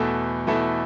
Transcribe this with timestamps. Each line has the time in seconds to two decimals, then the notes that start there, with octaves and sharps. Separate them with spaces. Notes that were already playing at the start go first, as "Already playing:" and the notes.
Already playing: E2 B2 A3 E4 A4
0.47 E2 B2 A3 E4 A4